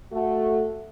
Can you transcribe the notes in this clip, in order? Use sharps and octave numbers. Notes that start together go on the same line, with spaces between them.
A3 F#4